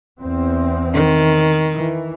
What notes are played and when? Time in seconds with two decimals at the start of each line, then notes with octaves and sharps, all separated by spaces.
0.20 E2 C4
0.94 D#3
1.76 E3